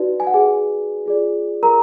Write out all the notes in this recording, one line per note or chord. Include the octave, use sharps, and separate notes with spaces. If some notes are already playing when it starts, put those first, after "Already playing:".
Already playing: D#4 F#4 B4 D5
G#5
F#5
G#4 G#5
F4 G#4 D5
A#4 A#5